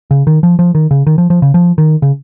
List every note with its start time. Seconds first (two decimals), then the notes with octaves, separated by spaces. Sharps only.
0.11 C#3
0.27 D#3
0.43 F3
0.59 F3
0.75 D#3
0.91 C#3
1.07 D#3
1.18 F3
1.30 F3
1.42 C#3
1.54 F3
1.78 D#3
2.02 C#3